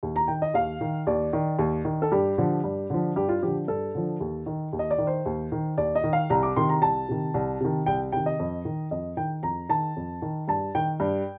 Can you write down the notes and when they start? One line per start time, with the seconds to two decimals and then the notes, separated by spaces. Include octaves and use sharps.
0.03 D#2
0.16 A#5
0.28 D#3 G5
0.42 D#5
0.54 D#2 F5
0.81 D#3
1.07 D#2 D5
1.33 D#3
1.58 D#2
1.85 D#3
2.02 A4
2.12 G2 G4
2.38 D3 F3
2.64 G2
2.90 D3 F3
3.16 G2 G4
3.29 F4
3.42 D3 F3 G4
3.68 G2 A4
3.95 D3 F3
4.20 D#2
4.46 D#3
4.73 D#2
4.79 D#5
4.91 D5
4.98 D#3
5.07 C5
5.26 D#2
5.52 D#3
5.78 D#2 D5
5.95 D#5
6.04 D#3
6.13 F5
6.30 C2 A#5
6.43 D6
6.56 C3 D#3 C6
6.69 A#5
6.82 C2 A5
7.09 C3 D#3
7.34 C2
7.60 C3 D#3
7.86 C2 G5
8.12 C3 D#3 G5
8.26 D#5
8.39 F2
8.65 D#3
8.91 F2 D#5
9.17 D#3 G5
9.43 F2 A#5
9.69 D#3 A5
9.96 F2
10.22 D#3
10.48 G2 A5
10.75 D#3 G5
11.00 G2